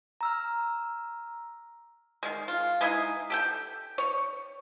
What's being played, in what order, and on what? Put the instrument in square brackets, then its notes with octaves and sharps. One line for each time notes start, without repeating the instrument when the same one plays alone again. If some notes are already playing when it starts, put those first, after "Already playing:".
[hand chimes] A#5 E6 F6
[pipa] D#3 G#3
F4
G#3 D#4 E4 G#4
G4 A4 G5
C#5